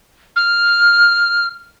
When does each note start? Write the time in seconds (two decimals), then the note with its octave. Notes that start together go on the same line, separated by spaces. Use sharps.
0.36 F6